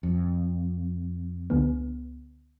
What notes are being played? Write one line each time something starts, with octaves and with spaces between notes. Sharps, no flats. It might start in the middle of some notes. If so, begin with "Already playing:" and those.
F2
C#2 D3 B3